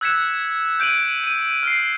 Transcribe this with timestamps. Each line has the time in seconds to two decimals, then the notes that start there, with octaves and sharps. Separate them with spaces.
0.01 E6 F#6 G#6 B6 C#7 E7
0.80 G6 D7 D#7 F#7
1.24 D#7
1.63 F6 C7